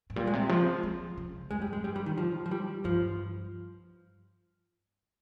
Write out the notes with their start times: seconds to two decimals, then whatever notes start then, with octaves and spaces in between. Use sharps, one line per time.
0.10 G#2
0.16 A#2 G3
0.27 G#3
0.33 C3
0.49 F3 G#3
0.83 F3
1.17 C#3
1.51 F2 G#3
1.62 G3
1.67 G#2
1.73 G#3
1.84 G2 G3
1.96 G3
2.06 D#3
2.18 F3
2.46 F3
2.51 G3
2.85 G2 F3